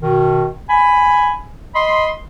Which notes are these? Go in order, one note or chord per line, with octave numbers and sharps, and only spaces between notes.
B2 D#3
G#5 B5
D#5 B5 C6